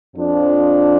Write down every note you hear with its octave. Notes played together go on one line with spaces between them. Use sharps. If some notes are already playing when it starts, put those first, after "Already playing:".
F2 F3 D4